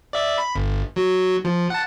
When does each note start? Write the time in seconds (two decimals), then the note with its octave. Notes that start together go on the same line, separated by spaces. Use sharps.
0.13 D5 E5
0.38 B5
0.55 G1
0.96 F#3
1.44 F3
1.70 F#5 A5